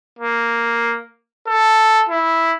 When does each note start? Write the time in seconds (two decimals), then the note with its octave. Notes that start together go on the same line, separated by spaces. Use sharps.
0.19 A#3
1.47 A4
2.09 E4